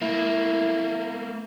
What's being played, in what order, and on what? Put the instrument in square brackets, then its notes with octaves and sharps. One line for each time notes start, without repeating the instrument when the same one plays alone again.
[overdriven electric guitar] A3 A#3 [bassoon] E4